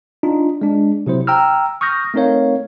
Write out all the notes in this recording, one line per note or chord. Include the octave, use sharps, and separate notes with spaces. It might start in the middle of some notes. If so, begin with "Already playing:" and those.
D4 D#4 F4
G#3 D4
C3 F#3 E4 C5
G5 A#5 E6 F6
C#6 D#6 F6 G6 A#6
A3 C4 D#4 A#4 C#5 F5